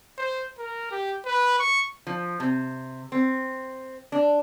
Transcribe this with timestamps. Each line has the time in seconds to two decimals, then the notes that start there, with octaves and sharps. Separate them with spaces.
0.18 C5
0.58 A#4
0.91 G4
1.26 B4
1.59 C#6
2.07 F3
2.40 C3
3.12 C4
4.12 D4